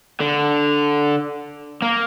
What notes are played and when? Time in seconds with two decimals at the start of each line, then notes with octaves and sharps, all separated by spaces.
0.20 D3
1.82 A#3